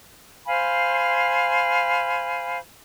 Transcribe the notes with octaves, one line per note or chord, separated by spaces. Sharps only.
C5 F5 G#5 B5